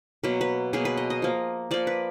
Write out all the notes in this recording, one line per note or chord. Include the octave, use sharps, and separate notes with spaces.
B2 F#3 A#3 B4
B4
B2 F#3 A#3 G#4
B4
D#5
D#5
F3 A#3
F3 A#3 D5
B4